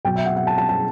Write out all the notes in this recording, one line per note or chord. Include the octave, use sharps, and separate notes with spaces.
B2 F#3 B3 G5
E5
F#5
F#5
A5
A5
A5